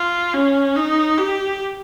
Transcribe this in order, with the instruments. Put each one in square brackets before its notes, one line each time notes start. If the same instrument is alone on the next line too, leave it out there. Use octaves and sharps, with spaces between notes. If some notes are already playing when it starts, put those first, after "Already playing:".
Already playing: [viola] F4
C#4
D#4
G4